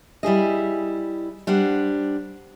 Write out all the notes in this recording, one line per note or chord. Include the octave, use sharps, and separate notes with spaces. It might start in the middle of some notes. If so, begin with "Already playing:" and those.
G3 E4 G#4 D#5
G3 D4 C5 F#5